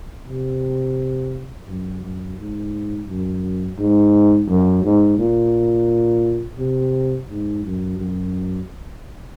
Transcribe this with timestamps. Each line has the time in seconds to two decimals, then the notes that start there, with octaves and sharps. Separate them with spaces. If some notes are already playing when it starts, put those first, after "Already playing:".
0.28 C3
1.68 F#2
2.03 F#2
2.38 G#2
3.07 F#2
3.78 G#2
4.48 F#2
4.83 G#2
5.18 A#2
6.58 C3
7.28 G#2
7.64 F#2
7.98 F#2